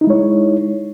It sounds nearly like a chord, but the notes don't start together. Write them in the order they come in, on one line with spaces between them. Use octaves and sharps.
D#4 E4 G#3 C#5